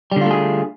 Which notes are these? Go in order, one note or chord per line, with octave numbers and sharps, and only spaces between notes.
D3 G3 A3 F4 G#4